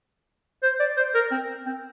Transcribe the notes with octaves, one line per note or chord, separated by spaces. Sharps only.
C5
D5
C5
A#4
C4
C4